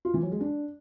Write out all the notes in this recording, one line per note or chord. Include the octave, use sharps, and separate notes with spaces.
F4
E3
F#3
G#3
D4